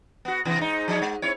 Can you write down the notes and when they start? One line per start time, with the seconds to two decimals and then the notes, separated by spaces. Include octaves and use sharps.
0.25 B3 F#4
0.45 C3 E3 B3
0.59 G#2 D#4
0.88 F3 D#4 C#5
1.02 G#3
1.22 C4 E4 C#5